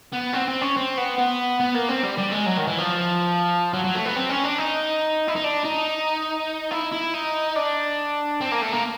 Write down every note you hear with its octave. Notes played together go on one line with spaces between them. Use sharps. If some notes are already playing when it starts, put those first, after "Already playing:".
B3
C4
C4
C#4
C4
B3
B3
B3
A#3
C4
G3
G3
G#3
F#3
D#3
E3
F3
F#3
F#3
A3
B3
C4
C#4
D4
D#4
E4
D#4
D4
D#4
E4
E4
D#4
D4
C4
A#3
A3
A#3